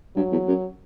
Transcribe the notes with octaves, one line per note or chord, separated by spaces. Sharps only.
G2 F#3
E2
F#2